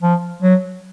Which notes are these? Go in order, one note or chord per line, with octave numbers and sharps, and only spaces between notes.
F3
F#3